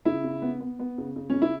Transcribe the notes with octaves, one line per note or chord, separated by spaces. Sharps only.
C#3 E4
C#3
B3
B3
B3
C#3
C#3
C#3 C#4
E4